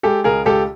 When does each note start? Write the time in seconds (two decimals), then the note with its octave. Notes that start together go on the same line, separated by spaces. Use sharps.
0.03 G#3 G4 A4
0.24 C#2 G#4 A#4
0.46 C#2 G4 A4